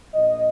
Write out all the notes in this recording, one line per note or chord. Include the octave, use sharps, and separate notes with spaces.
A#1 A#2 F3 D#5